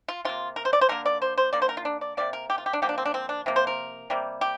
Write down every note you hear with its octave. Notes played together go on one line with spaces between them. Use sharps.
F4
C3 A#3 F4
A#4
C5
D5
C5
D3 A#3 A#4
D5
C5
C5
D3 A#3 D5
C5
A#4
F4
D4
D5
C3 F3 A#3 D5
A#4
G4
F4
G4
D4
D3 F3 A#3 G4
D4
C4
D4
C4
D4
C3 F3 A#3
C5
A#4
C3 G3 A#3
G4